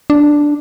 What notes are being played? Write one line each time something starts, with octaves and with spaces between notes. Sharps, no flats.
D4